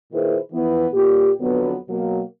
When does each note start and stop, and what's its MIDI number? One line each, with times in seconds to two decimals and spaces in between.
0.13 0.38 46
0.13 0.38 51
0.13 0.38 64
0.13 0.38 68
0.13 0.38 71
0.13 0.38 72
0.52 0.86 52
0.52 0.86 53
0.52 0.86 59
0.93 1.31 46
0.93 1.31 67
1.41 1.76 41
1.41 1.76 50
1.41 1.76 54
1.41 1.76 59
1.89 2.22 47
1.89 2.22 54
1.89 2.22 58